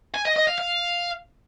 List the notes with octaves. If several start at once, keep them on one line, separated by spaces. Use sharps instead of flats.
G#5
D#5
D#5
F5
F5